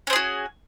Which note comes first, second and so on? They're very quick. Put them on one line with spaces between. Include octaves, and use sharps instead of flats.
C#4 C4 G#4 F#4